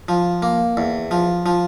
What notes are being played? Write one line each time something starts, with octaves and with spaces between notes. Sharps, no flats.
F3
A#3
E2
F3
F3